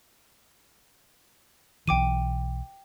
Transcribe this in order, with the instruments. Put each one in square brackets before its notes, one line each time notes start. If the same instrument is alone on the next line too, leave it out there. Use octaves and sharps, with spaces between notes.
[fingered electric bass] B1 E3 [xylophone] G5 D6 D#7